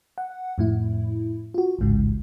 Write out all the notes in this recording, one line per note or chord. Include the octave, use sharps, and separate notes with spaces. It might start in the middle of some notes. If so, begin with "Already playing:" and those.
F#5
F2 A2 E4
F4 F#4
A1 D2 G#2 C#3